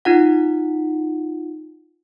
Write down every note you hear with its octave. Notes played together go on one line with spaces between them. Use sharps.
D#4 F4 F#5